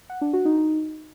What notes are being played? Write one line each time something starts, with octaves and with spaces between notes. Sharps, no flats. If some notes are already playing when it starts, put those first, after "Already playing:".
F#5
D4
F#4
D#4
D#4